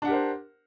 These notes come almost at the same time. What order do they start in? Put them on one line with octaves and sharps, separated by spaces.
D4 F#5 G4 A#4 C5